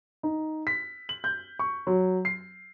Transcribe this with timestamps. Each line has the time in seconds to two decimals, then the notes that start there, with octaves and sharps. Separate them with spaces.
0.23 D#4
0.67 B6
1.09 F#7
1.24 G6
1.59 C#6
1.87 F#3
2.25 C7